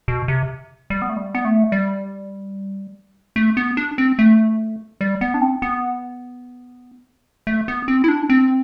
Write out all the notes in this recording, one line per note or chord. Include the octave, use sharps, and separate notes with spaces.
B2
C3
G3
B3
A3
G3
B3
A3
G3
A3
B3
D4
C4
A3
G3
B3
D4
C4
B3
A3
B3
C4
E4
D4
C4